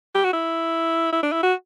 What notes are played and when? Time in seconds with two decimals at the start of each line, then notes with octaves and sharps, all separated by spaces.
0.15 G4
0.24 F#4
0.33 E4
1.12 E4
1.23 D4
1.32 E4
1.43 F#4